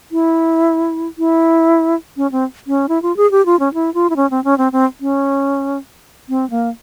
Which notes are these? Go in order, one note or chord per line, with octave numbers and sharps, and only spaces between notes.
E4
E4
C#4
C4
C#4
E4
F4
G#4
G4
F4
C#4
E4
F4
E4
C#4
C4
C#4
C4
C4
C#4
C4
A#3